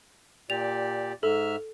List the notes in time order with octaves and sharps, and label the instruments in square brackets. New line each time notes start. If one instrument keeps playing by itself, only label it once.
[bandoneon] A#2 G4 D5 [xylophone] F7
[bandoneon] G#2 E5 F6 [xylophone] A4